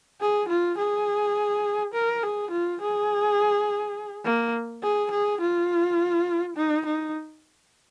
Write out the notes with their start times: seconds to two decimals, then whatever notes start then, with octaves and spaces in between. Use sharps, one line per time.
0.21 G#4
0.48 F4
0.78 G#4
1.94 A#4
2.23 G#4
2.51 F4
2.81 G#4
4.25 A#3
4.83 G#4
5.11 G#4
5.41 F4
6.56 D#4
6.86 D#4